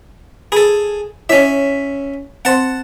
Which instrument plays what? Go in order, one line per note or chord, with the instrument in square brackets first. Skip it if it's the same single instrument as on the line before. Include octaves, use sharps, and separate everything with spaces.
[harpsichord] G#4 A4 [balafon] B5
[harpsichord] C#4 E5 [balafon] E4 C#5 D#5
[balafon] C4 C5 C6 [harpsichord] F#5 A5